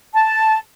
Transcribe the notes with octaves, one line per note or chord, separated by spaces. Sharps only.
A5